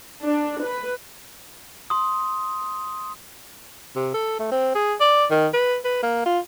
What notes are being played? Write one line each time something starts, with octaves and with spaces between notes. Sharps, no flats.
D4
B4
C6 D#6
C3
A4
A3
C4
G#4
D5
D#3
B4
B4
A#3
F4